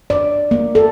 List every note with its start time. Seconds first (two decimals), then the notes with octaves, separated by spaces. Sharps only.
0.10 D5
0.51 A#3
0.75 A4